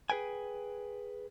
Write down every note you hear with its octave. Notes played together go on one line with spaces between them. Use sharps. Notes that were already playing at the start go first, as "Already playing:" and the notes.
G#4 A#4 B4 G5 G#5